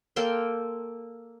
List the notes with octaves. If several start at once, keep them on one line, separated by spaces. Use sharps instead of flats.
A#3 A4 G5 C6